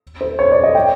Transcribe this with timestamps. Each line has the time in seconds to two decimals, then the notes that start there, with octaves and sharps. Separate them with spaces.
0.21 C5
0.39 C#5
0.52 D5
0.64 D#5
0.75 G5